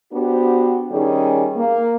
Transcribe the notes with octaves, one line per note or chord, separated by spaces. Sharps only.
B3 D4 F#4 G4 C5
D#3 G3 C#4 G#4
A#3